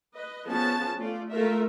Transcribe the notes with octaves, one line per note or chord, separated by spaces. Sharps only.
B4 D#5
F3 B3 C#4 G#4 A5
A3 F4 D5
A3 F4 A#4 E5